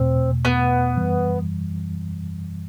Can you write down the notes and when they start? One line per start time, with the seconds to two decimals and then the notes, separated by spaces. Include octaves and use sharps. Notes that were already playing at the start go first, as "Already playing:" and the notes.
Already playing: E2 B2 A3 C4
0.45 B3
0.97 F#2 E3 G3